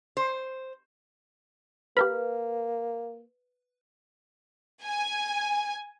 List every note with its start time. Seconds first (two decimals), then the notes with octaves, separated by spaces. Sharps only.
0.17 C5
1.97 A#3 G4 A#4 B4 F5 B5
4.83 G#5